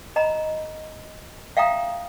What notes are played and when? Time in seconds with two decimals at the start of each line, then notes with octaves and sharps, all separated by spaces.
0.16 D#5 A#5 B5
1.57 E5 F5 G5 A#5 D#6